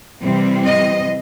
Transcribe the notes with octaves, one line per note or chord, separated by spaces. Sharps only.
C3 E3 G3 C4
D#5